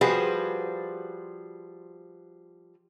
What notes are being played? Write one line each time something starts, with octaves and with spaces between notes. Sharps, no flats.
F3 G3 F#4 G#4 B4 C5